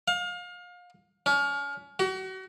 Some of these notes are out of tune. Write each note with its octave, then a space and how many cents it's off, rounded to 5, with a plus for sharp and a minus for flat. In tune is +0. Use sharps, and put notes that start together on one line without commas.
F5 +30
C#4 +35
F#4 +35